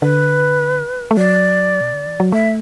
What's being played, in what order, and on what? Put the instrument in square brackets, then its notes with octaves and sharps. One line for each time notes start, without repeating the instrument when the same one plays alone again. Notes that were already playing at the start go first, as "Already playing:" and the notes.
[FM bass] D3 [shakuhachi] B4
[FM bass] A3
[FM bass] F#3 [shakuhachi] D5
[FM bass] B2
D3
E3
F#3
[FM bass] A3 [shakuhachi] E5